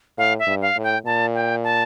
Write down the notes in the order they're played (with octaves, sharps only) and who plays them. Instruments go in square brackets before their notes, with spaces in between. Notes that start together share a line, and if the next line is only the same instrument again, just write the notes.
[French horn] A2 [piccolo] F5
[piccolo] E5
[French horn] G2
[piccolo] F5
[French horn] A2
[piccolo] G5
[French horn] A#2 [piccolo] A5
[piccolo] G5
A5